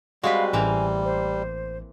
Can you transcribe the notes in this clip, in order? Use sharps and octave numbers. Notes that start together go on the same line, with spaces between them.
G3 G#3 C4 F#4 B4 F5
A1 E3 A#3 C4 G#5
C5